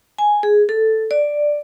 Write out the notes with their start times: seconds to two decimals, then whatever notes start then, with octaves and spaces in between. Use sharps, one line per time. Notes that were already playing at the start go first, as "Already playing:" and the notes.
0.18 G#5
0.43 G#4
0.69 A4
1.11 D5